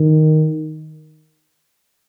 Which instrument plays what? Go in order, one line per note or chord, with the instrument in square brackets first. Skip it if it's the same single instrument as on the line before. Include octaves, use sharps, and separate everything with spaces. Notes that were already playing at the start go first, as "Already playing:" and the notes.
Already playing: [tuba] D#3